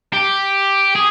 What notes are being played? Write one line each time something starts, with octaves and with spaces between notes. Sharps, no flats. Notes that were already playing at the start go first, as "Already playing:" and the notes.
G4
G#4